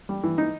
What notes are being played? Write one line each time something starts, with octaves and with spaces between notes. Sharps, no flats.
G3
E3
D#4